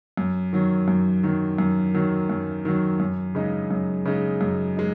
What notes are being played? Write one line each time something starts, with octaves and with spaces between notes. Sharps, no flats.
F#2
D#3 F#3
F#2
D#3 F#3
F#2
D#3 F#3
F#2
D#3 F#3
F#2
C#3 G#3 D#4
F#2
C#3 G#3 D#4
F#2
G#3 D#4